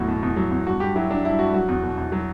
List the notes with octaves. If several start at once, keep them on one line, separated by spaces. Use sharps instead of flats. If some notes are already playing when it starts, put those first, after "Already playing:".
Already playing: E2 A2 F#3 F#4
B2
E2
F#3
E2
G2 F#4
G2 G4
F#3 E4
F#3 D4
G2 E4
G2 F#4
F#3 F#4
E2
B2
E2
F#3